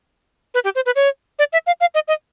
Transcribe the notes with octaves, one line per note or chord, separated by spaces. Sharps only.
B4
G4
C5
B4
C#5
D5
E5
F5
F5
D#5
D#5